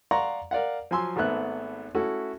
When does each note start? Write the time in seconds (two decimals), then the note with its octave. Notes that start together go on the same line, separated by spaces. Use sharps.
0.11 D5 F5 F#5 A#5 C6 C#6
0.51 A#4 D5 F5 F#5
0.91 F3 F#3 G#5 C6 E6
1.16 G#1 G#2 A3 B3 E5 F#6
1.95 A3 C#4 E4 F#4 A4